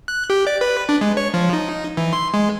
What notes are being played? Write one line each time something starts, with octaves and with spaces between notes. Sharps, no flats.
F#6
G4
D5
B4
D4
G#3
C#5
F3
D#4
E3
C6
G#3